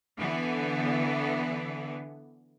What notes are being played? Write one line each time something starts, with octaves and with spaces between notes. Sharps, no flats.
D3 E3 B3